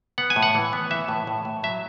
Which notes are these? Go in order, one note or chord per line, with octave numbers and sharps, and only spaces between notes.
B3 F#5
G#5
A2
F#5
E3
B3
E3 E5
A2
A2
A2
F#3 E5